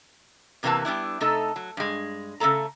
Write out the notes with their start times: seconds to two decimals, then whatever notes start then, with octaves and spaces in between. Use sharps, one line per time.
0.63 E2 C3 E3 A#3 B4 A5
0.85 G3 B3 D4 E4
1.20 C3 A3 D#4 A4
1.56 F#3
1.77 G2 G#3
2.40 C#3 G3 A3 A4 A#5